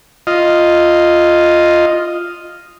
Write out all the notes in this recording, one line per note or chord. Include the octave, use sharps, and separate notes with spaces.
F4 D#5